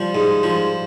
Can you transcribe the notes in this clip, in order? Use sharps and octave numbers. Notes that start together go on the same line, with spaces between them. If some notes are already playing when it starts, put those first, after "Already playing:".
Already playing: F3 G3
G#2
F3